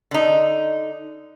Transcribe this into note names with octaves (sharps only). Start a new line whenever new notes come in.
D3 D#4